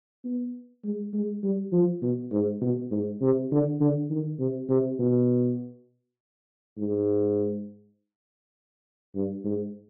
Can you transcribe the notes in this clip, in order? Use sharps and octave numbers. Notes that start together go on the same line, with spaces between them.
B3
G#3
G#3
G3
F3
B2
G#2
B2
G#2
C3
D3
D3
D#3
C3
C3
B2
G#2
G2
G#2